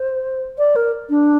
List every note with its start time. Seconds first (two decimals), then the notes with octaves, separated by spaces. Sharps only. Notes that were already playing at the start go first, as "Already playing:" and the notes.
Already playing: C5
0.58 D5
0.76 A#4
1.09 D4